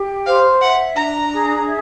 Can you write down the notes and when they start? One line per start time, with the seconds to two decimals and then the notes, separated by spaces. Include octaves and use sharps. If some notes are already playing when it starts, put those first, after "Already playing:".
Already playing: G4
0.26 C5 F5
0.60 E5 F#5
0.95 D4 A#5
1.31 G#4
1.65 E5